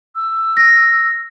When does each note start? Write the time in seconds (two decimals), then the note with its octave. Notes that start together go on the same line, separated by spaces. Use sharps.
0.16 E6
0.57 A#6